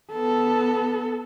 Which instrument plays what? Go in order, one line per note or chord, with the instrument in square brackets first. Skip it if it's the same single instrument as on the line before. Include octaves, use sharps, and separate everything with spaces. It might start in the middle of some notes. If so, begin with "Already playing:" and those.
[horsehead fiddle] B3 A4